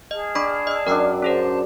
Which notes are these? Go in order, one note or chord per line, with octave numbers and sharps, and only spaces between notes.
G#4 D#5 A5 F6
D4 D5 B5 C#6
D#5 E6
F#2 D4 A#4 G5 E6
C#4 G#4 A#4 C5 A5